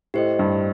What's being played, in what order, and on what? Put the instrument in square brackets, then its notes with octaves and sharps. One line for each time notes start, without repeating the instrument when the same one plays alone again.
[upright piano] A2 [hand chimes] G4 C5 D#5
[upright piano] G2